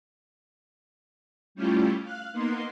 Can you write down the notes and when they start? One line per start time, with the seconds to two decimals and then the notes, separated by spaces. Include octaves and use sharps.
1.55 G3 A3 C#4 E4 F4 G4
2.03 F5 F#6
2.32 A#3 B3 D#4 C6